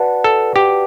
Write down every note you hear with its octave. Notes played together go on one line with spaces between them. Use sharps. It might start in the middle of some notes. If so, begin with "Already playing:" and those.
Already playing: F#4 B4 D5 F#5 A5
A4
G4